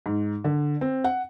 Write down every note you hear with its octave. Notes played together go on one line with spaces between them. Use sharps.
G#2
D3
C4
F#5